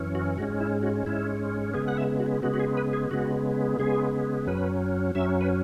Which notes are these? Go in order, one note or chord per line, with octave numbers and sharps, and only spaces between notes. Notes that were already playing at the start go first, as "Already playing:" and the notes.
Already playing: F#2 E3 C#4
F#4
G#2 G#3 C#4 F#4
E4
F#4
G#2 G#3 C#4 E4
C#3 G#3 B3 G#4
F#5
E5
F#4
C#3 G#3 B3 F#4
F#4
G#4
B4
G#4
C#3 G#3 B3 F#4
C#3 G#3 B3 G#4
F#2 F#3 C#4 B4
F#2 F#3 C#4 E5
B4